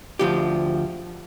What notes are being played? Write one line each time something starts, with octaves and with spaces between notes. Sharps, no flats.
D2 F3 G4